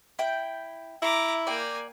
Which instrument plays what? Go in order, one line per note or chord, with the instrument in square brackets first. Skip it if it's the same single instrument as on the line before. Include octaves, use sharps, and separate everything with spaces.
[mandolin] E4 G5
[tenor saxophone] E4 [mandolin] E5 [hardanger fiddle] A#5 D6
[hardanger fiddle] A#3 G#5 [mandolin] D5 G5